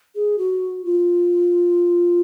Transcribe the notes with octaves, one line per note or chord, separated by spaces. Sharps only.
G#4
F#4
F4